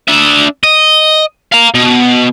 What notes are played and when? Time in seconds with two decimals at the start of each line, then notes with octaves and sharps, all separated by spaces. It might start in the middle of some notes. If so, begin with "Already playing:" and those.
0.08 D4 E5
0.63 D#5
1.53 F5 A#5
1.75 B2